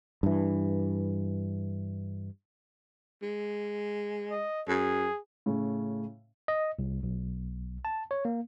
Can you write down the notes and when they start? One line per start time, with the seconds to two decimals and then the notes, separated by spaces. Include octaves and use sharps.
0.23 G2 E3
3.22 G#3
4.31 D#5
4.68 F#2 G#4
5.46 A2 C#3
6.48 D#5
6.79 C2
7.03 B1
7.85 A5
8.11 C#5
8.25 A#3